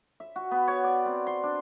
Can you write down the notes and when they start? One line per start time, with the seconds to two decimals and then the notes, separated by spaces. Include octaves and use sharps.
0.20 E5
0.36 F#4
0.51 B3
0.68 C#5
0.84 D5
1.06 C4
1.27 C6
1.43 D4